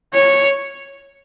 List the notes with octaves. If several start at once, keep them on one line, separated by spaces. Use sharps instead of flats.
C#5